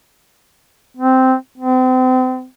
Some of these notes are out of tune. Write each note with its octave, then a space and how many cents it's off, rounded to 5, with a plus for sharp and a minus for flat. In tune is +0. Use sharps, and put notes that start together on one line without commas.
C4 -10
C4 -35